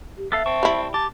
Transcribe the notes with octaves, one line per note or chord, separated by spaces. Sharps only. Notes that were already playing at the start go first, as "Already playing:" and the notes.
G4
B3 A4 E5 F5
C4 A5 C#6
G3 E4
G4 A5